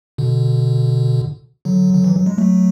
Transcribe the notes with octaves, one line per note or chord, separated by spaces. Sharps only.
B2 D3
D3 F#3
D3
E3
F#3
G#3
F#3 A3